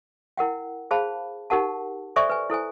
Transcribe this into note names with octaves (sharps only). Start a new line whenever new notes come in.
E4 A#4 F#5 G5
G#4 C5 F5 A5 B5
D#4 G4 A#4 F#5 A5
A4 C5 D5 E5 G#5 C#6
B4 G#5
E4 A4 C5 G#5